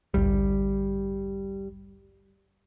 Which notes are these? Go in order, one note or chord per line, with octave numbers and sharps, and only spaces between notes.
A1 D2 G2 G3